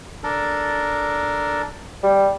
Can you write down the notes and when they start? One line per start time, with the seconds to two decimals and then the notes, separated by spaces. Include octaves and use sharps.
0.23 D4 A4 A#4
2.03 G3